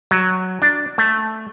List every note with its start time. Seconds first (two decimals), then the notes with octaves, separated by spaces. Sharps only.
0.11 F#3
0.62 D4
0.98 A3